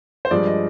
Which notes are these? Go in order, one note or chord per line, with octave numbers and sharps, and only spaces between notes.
C5
G2 F3 G#3 D5
D#5